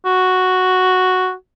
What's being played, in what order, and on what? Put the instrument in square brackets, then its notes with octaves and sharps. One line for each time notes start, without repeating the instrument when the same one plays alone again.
[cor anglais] F#4